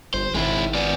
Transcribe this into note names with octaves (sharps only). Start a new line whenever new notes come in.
G1 C5
G#1 G#3 E4
B3 D5